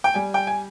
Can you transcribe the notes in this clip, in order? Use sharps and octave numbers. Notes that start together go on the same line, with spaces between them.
G5
G3 G#5
G5
G#5